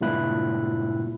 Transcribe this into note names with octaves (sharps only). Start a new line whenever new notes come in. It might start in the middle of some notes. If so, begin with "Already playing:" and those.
C#2 G2 A#2 E4 F#6